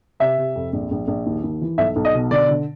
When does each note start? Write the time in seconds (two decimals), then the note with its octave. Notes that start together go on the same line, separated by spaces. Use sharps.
0.20 C3 E5
0.38 C3
0.55 F2
0.73 A#1
0.91 A#1
1.07 A#1
1.26 D#2
1.44 D#2
1.61 E3
1.78 B1 E5
1.96 B1
2.05 D#5
2.14 B2
2.31 D3 D5
2.49 D3